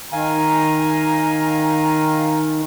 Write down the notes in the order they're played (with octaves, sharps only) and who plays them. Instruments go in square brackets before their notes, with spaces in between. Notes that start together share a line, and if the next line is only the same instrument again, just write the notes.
[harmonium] D#3 [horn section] F5 G#5 A#5